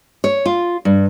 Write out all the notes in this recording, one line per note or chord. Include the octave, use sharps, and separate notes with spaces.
C#5
F4
G2